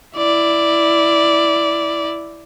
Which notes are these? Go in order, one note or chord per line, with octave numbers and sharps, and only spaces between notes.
E4 D5